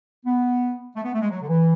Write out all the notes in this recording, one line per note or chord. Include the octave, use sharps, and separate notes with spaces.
B3
A3
B3
A3
G#3
F#3
D3
E3